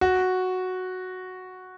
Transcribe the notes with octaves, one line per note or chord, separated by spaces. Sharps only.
F#4